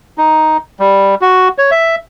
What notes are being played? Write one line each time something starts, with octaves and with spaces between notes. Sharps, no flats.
D#4
G3
F#4
C#5
E5